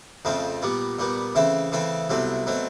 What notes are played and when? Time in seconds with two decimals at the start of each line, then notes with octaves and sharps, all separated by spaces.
0.25 F2 C#3 F3 A3 C4
0.62 A#2 G3 B3
0.99 A#2 G3 B3
1.35 C#3 E3 A3 C4
1.72 C#3 E3 A3 C4
2.10 C2 B2 F#3 A3 C4
2.46 B2 F#3 A3 C4